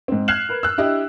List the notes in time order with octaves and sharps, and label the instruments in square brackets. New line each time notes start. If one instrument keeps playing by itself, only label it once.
[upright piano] G#2 C4
F6 F#6 G#6 C7 E7 F#7
A#4 B4
E6 F#6
D4 E4 G4 D#5